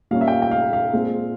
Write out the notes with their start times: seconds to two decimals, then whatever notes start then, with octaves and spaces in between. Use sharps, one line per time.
0.11 A#2 G3 A#3 C#4 F5
0.21 E5
0.28 G5
0.32 F5
0.42 G5
0.51 F5
0.73 F5
0.93 A#2 G#3 C4